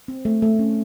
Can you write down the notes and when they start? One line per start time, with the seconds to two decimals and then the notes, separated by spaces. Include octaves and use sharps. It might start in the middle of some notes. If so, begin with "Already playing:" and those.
0.08 C4
0.25 A3
0.42 A3
0.59 C#4